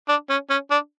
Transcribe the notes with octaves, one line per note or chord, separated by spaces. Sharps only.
D4
C#4
C#4
D4